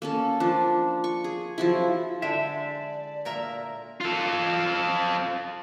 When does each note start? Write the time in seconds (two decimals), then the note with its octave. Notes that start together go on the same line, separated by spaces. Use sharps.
0.02 A#3 C#4 A4
0.40 F3 D4
1.04 C#6
1.24 G#4
1.58 F3 F#3 E4
2.22 D3 G#3 D5 E5 G5
3.25 A#2 A#4 E5
4.01 F4 A4